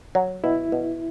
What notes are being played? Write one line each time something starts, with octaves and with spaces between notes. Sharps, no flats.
F#3
B2 E4
B2